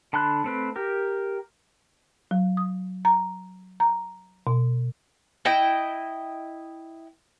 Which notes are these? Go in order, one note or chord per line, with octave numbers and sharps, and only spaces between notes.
D3 A5 B5 C6 F#6
A3 C4 B4
G4 A#4
F#3
D#6
A#5
A#5
B2
E4 D#5 G5